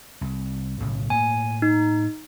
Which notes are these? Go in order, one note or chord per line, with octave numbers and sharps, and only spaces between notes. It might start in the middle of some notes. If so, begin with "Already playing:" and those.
C2
B1 A2 C#3
A2 A#3 G#5
D#4